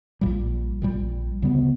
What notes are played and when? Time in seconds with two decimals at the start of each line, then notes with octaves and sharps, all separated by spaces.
0.21 A#1 A#2 G3
0.82 A#1 A#2 G3
1.42 D2 C#3 G3 B3